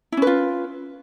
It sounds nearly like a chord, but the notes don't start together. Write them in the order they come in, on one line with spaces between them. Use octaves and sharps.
E4 C#4 B4 F4